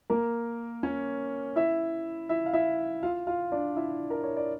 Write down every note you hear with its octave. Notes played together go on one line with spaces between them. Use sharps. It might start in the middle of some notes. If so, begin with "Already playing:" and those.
A#3 A#4
C#4 C#5
E4 E5
E4 E5
F5
E4 E5
F4 F5
F4 F5
D4 D5
E4 E5
A#4
C#5
D5